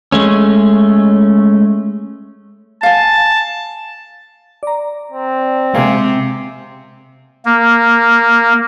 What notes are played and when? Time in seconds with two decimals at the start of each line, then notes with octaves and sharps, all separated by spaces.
0.12 G#3 A3 C#4
2.83 F5 G#5 A5
4.63 D5 A#5
5.12 C4
5.74 C3 G#3 F5 G#5
7.45 A#3